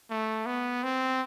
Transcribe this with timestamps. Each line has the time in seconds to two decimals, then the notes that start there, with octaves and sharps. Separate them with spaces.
0.10 A3
0.46 B3
0.84 C4